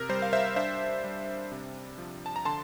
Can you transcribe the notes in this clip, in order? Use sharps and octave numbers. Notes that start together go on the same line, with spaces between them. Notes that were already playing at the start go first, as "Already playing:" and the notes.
Already playing: C3 A#4
G3 C5
F5
C5 E5
D4 C5 E5
G3
C3
F3
A5
A#5
D3 A5 C6